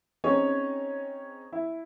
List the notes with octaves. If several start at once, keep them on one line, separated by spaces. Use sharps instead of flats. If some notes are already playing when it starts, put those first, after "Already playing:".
C4 C#4 D#4 G#4 C#5
E4